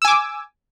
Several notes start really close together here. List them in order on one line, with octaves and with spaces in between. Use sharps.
E6 G#5 D6